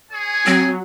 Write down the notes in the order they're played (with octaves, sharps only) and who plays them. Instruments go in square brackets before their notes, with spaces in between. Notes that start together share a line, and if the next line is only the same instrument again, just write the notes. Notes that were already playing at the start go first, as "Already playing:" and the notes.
[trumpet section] G#4 C#5 G#5
[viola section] F#3 [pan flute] C4